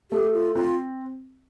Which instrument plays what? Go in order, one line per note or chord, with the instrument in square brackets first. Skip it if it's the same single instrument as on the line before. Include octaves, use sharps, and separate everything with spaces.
[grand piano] A3 [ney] G4
[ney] F4
[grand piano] C4 [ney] F4